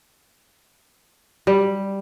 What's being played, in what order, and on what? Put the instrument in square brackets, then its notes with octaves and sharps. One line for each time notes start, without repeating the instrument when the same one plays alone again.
[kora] G3